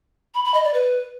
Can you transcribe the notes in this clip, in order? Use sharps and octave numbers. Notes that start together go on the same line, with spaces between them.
B5
B5
D#5
D5
B4